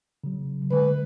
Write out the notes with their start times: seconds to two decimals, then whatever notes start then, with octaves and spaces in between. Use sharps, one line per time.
0.24 C#3 F#3
0.71 D3 G#3 B4